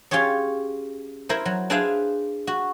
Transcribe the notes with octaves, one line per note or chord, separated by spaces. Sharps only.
C#4 F4 G4 G#4 C#5
E4 A#4 C5
F#3
D4 G#4 B4 C5 E5 F5
F#4